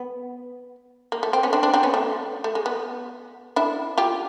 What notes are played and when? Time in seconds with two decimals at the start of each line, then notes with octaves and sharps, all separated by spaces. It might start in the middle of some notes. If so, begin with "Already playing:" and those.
Already playing: B3
1.12 A#3
1.23 A3
1.33 C4
1.43 B3 C#4
1.53 C4 D4
1.63 C4 D4
1.74 C4 D4
1.83 B3 C#4
1.94 A3
2.44 A3
2.55 G#3
2.66 B3
3.56 D4 E4
3.98 F4 G4